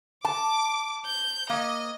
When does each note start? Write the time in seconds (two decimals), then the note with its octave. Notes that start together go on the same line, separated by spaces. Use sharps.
0.25 A5 D6
1.06 G6
1.50 A#3 D#5